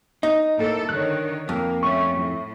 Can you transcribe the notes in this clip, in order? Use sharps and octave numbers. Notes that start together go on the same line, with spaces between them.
D#4 D#5
A2 A#3 A4
D3 D#3 C#5 F#6
F2 A#3
A3 C#4 C#6
A2